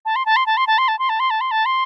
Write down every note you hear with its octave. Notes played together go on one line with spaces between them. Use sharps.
A5
C6
A5
C6
A5
C6
A5
C6
A5
C6
A5
C6
A5
C6
A5
C6